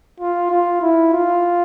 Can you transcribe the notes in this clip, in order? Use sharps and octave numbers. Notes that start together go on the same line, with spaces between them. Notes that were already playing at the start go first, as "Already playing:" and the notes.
F4
F4
E4
F4